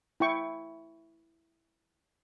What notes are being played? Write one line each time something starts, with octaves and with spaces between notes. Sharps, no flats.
E4 G5 C#6